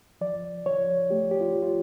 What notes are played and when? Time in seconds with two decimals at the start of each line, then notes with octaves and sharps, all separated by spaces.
0.21 F3 D5
0.66 F3 C#5
1.10 A3 G4
1.31 G4
1.41 F4
1.55 F3
1.62 F4